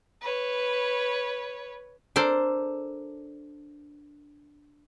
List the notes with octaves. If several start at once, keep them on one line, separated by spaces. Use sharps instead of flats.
B4 C#5
D4 A4 A#4 C5